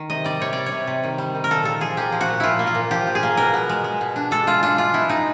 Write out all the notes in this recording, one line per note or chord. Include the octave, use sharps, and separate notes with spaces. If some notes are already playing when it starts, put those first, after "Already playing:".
Already playing: D#3
C3 D#5
G3 D5
C3 C#5
G3 D5
C#5
C3
C3
D#3
G3
D#3
A#4
A#2 A4
A#2 A4
F3 G#4
A#3 G4
F3
F#4
A#2
A#2 E4 F4
A#3
F4
A#2
F3 G4
A#2
G#4
A#3
B2 A#4
B3
G#3
G#3
B2
D4
G#3 A4
G#3 F4
D4 F4
G#3 F4
B3 E4
G#3 D#4